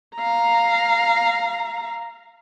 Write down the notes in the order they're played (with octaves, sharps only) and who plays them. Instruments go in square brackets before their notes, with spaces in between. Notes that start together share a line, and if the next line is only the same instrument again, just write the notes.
[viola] F5 A#5